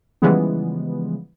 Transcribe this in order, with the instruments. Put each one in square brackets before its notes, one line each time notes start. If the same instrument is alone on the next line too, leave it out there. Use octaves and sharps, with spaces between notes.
[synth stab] C#3 E3 F3 G3 G#3 B3